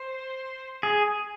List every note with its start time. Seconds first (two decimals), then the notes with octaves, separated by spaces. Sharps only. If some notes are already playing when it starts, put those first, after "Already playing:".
Already playing: C5
0.83 G#4